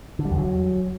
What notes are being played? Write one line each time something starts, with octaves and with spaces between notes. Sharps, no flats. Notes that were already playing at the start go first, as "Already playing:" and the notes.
D3
G3
E2
F#3